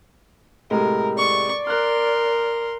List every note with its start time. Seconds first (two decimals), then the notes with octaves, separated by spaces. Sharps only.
0.71 A2 C3 G#3 A#4
1.18 D5 C#6
1.67 A#4 C6 F6 F#6